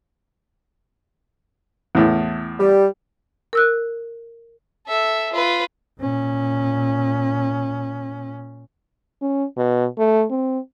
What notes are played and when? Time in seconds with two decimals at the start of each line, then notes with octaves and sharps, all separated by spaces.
1.95 E2 A2
2.60 G3
3.53 A#4 E6 F#6
4.87 A4 E5
5.33 F4 B4
6.00 A#2 C#4
9.22 C#4
9.57 B2
9.98 A3
10.30 C4